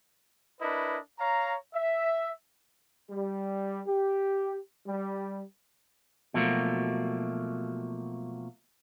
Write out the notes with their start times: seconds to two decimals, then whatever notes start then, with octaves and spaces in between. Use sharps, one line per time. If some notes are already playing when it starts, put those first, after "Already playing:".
0.61 D4 E4 A#4 B4 D#5
1.20 C#5 F5 A#5
1.74 E5
3.10 G3
3.87 G4
4.87 G3
6.34 B2 F3 F#3 A3 A#3